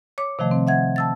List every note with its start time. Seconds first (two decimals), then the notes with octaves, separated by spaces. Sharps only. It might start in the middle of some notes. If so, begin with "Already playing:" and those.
0.18 C#5 D6
0.39 C3 D#3 F3 A3
0.51 C4
0.67 E5 F#5 G#6
0.96 A5 E6 A6